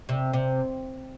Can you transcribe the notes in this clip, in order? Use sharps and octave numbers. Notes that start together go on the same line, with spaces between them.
C3
C3